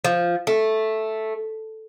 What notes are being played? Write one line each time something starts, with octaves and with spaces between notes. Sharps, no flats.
F3
A3